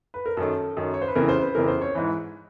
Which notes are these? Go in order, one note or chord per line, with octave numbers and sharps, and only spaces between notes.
B4
A#4
F#2 D#3 A4
F#2 D#3
C#5
C5
B4
F2 C#3 E3 A#4
C5
B4
F2 C#3 E3 A#4
C5
C#5
G#2 E3